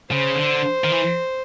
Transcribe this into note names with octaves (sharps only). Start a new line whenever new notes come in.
C#3 C5
D3
D#3
E3